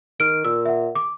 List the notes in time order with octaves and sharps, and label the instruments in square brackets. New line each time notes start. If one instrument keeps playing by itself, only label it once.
[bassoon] D#3 [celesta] F6 D7
[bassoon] A#2 [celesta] E6
[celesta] E5 F#5
D6